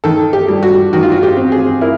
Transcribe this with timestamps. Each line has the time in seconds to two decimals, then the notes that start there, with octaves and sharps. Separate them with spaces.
0.04 D#3 A4
0.33 G4
0.49 G3
0.63 F#4
0.93 D#3 F#4
1.03 F4
1.12 F#4
1.23 G4
1.37 C4
1.52 G#4
1.81 E4 A#4